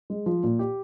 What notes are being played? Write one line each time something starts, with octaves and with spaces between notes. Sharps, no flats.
G#3
F3
A#2
G4